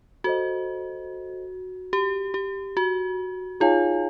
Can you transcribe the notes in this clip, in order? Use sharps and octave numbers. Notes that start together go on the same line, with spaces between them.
F#4 A4 C5 D#5
G4
G4
F#4
D#4 F4 G#4 C#5 F5 G#5